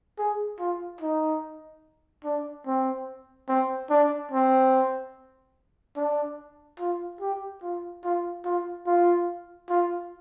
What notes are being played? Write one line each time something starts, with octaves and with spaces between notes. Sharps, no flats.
G#4
F4
D#4
D4
C4
C4
D4
C4
D4
F4
G4
F4
F4
F4
F4
F4